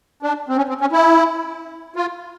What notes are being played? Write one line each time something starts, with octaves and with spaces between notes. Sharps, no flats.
D4
C4
C#4
C4
C#4
E4
F4